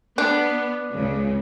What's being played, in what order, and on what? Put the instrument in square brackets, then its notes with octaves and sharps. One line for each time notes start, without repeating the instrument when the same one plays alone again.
[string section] B3 [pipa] D4
[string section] C#2 C#3